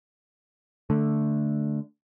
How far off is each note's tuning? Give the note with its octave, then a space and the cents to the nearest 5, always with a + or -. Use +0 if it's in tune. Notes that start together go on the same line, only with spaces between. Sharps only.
D3 +0 A3 +0